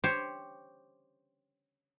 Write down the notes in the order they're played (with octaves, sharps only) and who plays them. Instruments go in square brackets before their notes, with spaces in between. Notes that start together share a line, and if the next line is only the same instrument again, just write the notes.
[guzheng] G4 C5 C#5